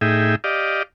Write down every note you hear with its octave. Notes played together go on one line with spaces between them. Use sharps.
A2 D#4 G#4 E5 G5
G4 D5 D#5 F5